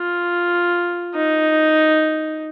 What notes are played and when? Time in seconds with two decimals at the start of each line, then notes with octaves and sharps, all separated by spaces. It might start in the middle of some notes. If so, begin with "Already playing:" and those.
Already playing: F4
1.15 D#4